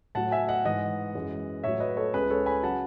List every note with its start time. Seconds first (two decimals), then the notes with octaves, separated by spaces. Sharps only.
0.15 A2 F#3 F#5 A5
0.31 E5 G#5
0.48 D#5 F#5
0.65 G#2 E3 G#3 D#5 F#5
1.15 F#2 E3 G#3
1.64 A2 F#3 C#5 E5
1.80 B4 D#5
1.97 A4 C#5
2.14 C#2 C#3 G#3 G#4 B4
2.30 A4 C#5
2.46 G#5 B5
2.63 C#3 F#3 F#5 A5